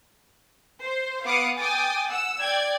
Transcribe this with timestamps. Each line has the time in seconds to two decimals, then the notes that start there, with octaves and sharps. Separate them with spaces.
0.83 C5
1.25 B3 F5 F#5 D6 D#6 C#7
1.58 G5 G#5 D6 D#6 A6
2.08 F#5 E6
2.40 D5 G5 G#6